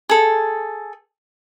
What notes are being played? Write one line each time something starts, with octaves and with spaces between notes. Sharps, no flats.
G#4 A4